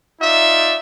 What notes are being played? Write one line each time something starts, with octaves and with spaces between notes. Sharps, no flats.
D#4 F4 D5 E5